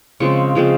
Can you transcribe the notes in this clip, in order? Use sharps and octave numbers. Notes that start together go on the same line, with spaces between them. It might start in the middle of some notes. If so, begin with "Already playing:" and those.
C#3 F3 G#3 C4 C#6
C#3 F3 G#3 C4